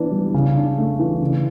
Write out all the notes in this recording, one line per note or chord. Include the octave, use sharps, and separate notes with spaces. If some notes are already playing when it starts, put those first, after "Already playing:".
Already playing: E3 B3 D4
G3
C#3
D4
A3
E3
C#3